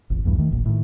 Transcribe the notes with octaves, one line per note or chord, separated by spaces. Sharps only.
D#1 G#1
B1 E2 G2 E3
D#3 A3
F1 A#1 A#2
A2 D#3